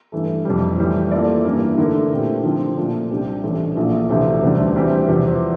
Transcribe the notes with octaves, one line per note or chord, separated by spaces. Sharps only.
G2 E3 A3
F2 C3 G3
A2 E3 G3
E3 A#3 F4 A4 D5
A1 G2 E3 A#3
D3 A3 E4 A#4
A#2 A3 C4 G4
D3 F3 C4
A#2 A3 D4
C2 C3 G3 D4 G4
A1 A2 E3 A3 D4
A#1 A#2 A3 E4
D2 C3 E3 A3 E4
E1 D2 C3 G3 D4
E3 G3 C4 G4
E2 C3 F3